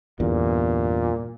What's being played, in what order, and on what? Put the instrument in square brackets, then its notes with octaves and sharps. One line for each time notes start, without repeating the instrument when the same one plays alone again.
[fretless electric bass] G1 E2 G2 [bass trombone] A#2